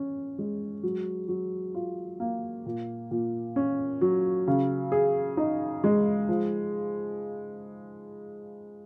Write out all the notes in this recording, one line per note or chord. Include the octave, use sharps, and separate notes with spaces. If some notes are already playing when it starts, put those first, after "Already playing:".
Already playing: C#4
G#3
F#3
F#3
F4
A#3
A#2
A#2
C#4
F#3
C#3
G#4
D#4
G#3
F3